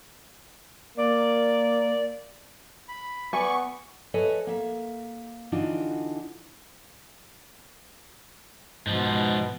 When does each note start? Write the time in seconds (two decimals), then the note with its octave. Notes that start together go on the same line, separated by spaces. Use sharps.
0.97 A#3 D5
2.88 B5
3.33 B3 D5 G#5 B5 C#6
4.14 A4 B4 C#5 D#5 E5 G#5
4.47 A#3 E5
5.52 D3 E3 D4 D#4 F4 F#4
8.87 G#2 B2 F3